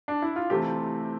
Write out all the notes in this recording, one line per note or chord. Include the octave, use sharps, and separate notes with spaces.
D4
E4
F4
C3 E3 A3 C4 G4